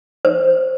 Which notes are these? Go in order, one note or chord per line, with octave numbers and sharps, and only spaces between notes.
C5